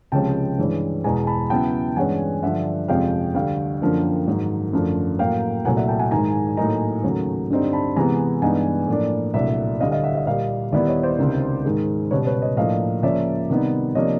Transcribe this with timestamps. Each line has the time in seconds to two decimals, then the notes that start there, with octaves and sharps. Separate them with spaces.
0.12 C#2 C3 F3 G#3 C#4 G5 A5
0.58 G2 E3 G#3 C#4
1.04 E2 B2 G#3 G#5 A#5
1.27 A5 B5
1.50 C#3 F#3 B3 E4 G5 A5
1.96 G2 E3 G#3 C#4 F#5 G#5
2.42 G2 D3 F3 E5 F#5
2.88 F2 C3 F3 G#3 C#4 F5 G5
3.34 D2 D3 G3 F5 G5
3.81 F#2 D3 F3 A#3 D4
4.27 G#2 D#3 F#3
4.73 F#2 D3 F3 A3
5.19 A2 F#3 A#3 F5 G5
5.65 C2 A#2 F#3 A3 F#5 G#5
5.77 E5 F#5
5.88 G5 A5
5.99 F#5 G#5
6.11 G#2 D#3 G#3 G#5 A#5
6.57 A2 F#3 A#3 D#4 G#5 A#5
7.04 D#2 C#3 F#3 A3
7.50 G2 D3 G3 C4 D#4
7.73 A5 B5
7.96 C3 E3 G#3 B3 G#5 A#5
8.42 G2 E3 G#3 B3 D#4 F#5 G#5
8.88 A2 F3 A#3 D4
9.34 C2 A#2 F#3 A3 D4 D5 E5
9.80 D2 D3 G3 D#5 F5
9.91 D#5 F5
10.04 E5 F#5
10.15 D#5 F5
10.26 A#2 G3 A#3 D#5 F5
10.72 D#2 D#3 G3 B3 E4 D5 E5
10.88 C#5 D#5
11.03 C5 D5
11.19 C#2 C3 D#3
11.65 G#2 D#3 G#3
12.10 C#2 B2 G3 B4 C#5
12.26 B4 C#5
12.42 C#5 D#5
12.57 A2 F3 A#3 D4 D#5 F5
13.03 C#2 C#3 F3 A#3 C#4 D5 E5
13.50 C3 D#3 G3 B3 D#4
13.95 C3 F3 A#3 D4 C#5 D#5